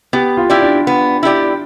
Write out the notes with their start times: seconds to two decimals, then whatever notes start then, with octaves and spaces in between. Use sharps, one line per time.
0.13 B3 G4
0.37 F4
0.50 E4 G4 D5
0.62 D4
0.87 B3
1.23 E4 G4 D5